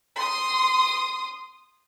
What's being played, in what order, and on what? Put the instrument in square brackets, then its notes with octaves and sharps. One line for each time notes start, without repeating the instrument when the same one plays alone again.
[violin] C6 D#6